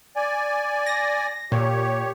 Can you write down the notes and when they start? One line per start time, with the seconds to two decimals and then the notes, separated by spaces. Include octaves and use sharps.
0.16 D5 G#5
0.86 A#6
1.52 A#2 G4 C#5